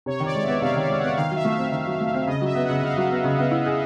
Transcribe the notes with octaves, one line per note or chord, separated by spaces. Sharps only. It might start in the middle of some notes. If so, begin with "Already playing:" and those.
C3 C#5
D#3
D5
G#3
B3 E5
C3 F5
D#3 F5
G#3
B3 F#5
D#3 F5
F#3 E5
A3
C4 E5
D#3
F#3
A3
C4
C#3 D#5
F#3 E5
B3
F#5
C#3
C#3 F5
F#3
B3
C#3
B3
E4
G#4